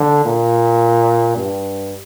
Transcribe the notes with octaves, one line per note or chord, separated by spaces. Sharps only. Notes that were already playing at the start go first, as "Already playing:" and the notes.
Already playing: D3
A#2
G2